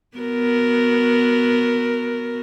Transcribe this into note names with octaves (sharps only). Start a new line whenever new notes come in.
B3 F#4 A#4